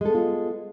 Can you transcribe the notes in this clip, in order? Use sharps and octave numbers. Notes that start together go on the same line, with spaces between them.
G#3 B3 F4 A4